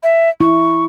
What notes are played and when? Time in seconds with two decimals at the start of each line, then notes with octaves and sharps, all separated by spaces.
0.03 E5
0.40 E4 C#6